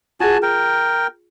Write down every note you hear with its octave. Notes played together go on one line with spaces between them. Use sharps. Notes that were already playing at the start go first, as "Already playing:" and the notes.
F4 F#4 G#4 G#5 A5
A#4 G5